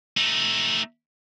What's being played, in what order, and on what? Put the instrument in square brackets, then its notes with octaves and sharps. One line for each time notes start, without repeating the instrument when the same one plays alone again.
[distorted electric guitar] A3 D#4